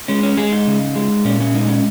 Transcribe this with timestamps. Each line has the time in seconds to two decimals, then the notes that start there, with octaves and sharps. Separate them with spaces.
0.08 G#3 C#4
0.23 C#4
0.37 G#3 G#4
0.52 D#4
0.67 C#3
0.95 G#3
1.25 A#2 C#4
1.40 C#4
1.54 G#3 D#4
1.68 C#4